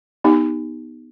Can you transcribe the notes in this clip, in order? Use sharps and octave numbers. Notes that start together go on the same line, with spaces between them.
B3 D#4 G4